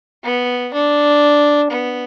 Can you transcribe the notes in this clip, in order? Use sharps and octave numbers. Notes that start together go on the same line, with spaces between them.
B3
D4
B3